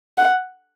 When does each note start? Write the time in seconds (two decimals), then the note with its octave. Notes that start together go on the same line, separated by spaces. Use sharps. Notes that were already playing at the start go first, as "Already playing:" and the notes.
0.18 F#5